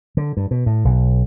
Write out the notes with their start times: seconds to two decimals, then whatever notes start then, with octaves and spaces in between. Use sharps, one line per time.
0.17 D3
0.37 G2
0.51 B2
0.66 A2
0.85 B1